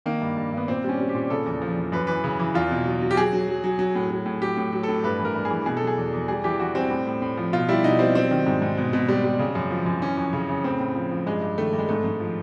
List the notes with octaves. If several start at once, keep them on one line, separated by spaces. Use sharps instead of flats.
D#3 A#3
G2
G2
G2 B3
A#2 C4
G3
C#4
G3
G4
A#2
C#3 A4
E2
F3
E2
F#2 B4
E3 B4
C#3
E3
E2 F4
B2
F#3
F#3
G4
F#3 G#4
F#3
F#3
F#3
F#3
A2
F#3
A2
F#3 G4
A2
F#3
A4
A2
G2 B4
E3
A#4
G2
G#4
E3
B2 G#4
F#3 A4
G#4
E2
E2
G3 G#4
E3 G4
E3 F#4
G3 C4
A2
A2
A2
F3
B2 F4
G3 E4
B2 D#4
G3 C4
F#3 C4
D#3
G#2
G#2
B2
B2
G3
G3
C#3
F#2
F3
F#2
E3 C#4
F2
C#3
C#3
A2 C4
A2
F3
F3
G2 G#3
G2
D#3 A3
G2
G#3
G#2 A3
G#2
F3